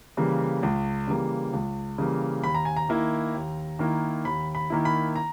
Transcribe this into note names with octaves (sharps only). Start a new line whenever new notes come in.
C#3 E3 G3 A#3
C#2
C#3 E3 G3 A#3
C#2
C#3 E3 G3 A#3
D#2 B5
A#5
G#5
A#5
D#3 A#3 E4
D#2
D#3 A#3 E4
D#2 B5
B5
D#3 A#3 E4
B5
A#5